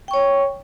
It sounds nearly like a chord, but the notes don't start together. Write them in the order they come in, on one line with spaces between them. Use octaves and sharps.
G5 C#6 C#5